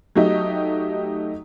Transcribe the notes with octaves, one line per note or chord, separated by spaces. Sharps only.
F#3 A3 D#4 G4 D#5